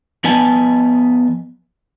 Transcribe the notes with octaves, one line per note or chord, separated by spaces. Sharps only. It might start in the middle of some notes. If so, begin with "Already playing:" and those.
F3 B3 B4 D#5 G#5 A5